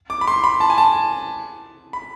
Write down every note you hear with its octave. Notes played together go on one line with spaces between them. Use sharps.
D6
B5
C6
B5
A5
G#5
A5
B5